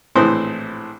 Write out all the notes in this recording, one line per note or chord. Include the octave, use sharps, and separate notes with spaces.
A#1 A2 E3 C4 C5 D#6